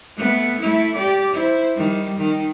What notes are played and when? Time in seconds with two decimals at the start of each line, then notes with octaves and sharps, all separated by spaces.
0.16 A3 B3
0.61 A3 E4
0.95 G4 D5
1.34 E4 C5
1.75 D#3 G3
2.18 D#3